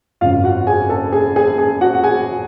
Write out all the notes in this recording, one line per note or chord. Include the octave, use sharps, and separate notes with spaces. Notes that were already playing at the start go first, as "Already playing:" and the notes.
G#1 F#2 C#3 F4 F5
F#4 F#5
G#4 G#5
A4 A5
G#4 G#5
G#4 G#5
G#4 G#5
F#4 F#5
F#5
G#4 G#5